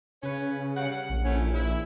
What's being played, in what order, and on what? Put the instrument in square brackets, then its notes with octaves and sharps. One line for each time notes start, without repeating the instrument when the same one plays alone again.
[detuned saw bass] C#3 [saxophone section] C#4 B4 C#5
[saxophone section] G3 C#4 F#5
[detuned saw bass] A#1
[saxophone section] E3 A3 C#4
E4